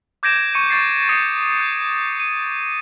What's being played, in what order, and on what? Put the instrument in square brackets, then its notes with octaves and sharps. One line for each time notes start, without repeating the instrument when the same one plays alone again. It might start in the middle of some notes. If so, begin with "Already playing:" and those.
[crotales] D6 G6 G#6 A#6 D7 E7
C#6 C#7 D#7
C#6 A6 C7
C#6 D#6 A#6 C7 C#7 D#7
G6 C#7
D#7